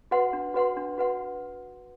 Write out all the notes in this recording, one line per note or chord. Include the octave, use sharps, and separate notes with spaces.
F#4 B4 F#5 C6
D4
F#4 B4 F#5 C6
D4
F#4 B4 F#5 C6